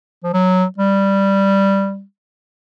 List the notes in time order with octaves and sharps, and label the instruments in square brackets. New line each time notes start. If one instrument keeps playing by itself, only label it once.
[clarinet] F3
F#3
G3